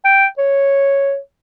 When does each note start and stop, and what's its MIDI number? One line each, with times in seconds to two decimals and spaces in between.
0.05 0.26 79
0.38 1.18 73